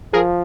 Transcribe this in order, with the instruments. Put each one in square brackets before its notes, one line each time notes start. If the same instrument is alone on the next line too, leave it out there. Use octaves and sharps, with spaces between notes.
[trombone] F3 [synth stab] G#4 A#4